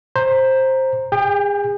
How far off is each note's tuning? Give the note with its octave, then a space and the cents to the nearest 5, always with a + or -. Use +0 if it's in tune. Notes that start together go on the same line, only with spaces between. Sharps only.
C5 +10 A#5 +0
G#4 -35 G5 +20